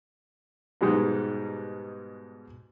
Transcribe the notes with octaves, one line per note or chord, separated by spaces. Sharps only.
G#2 B2 G3 G#3 D#4